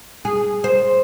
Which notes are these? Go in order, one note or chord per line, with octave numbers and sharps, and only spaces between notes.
G#4
C5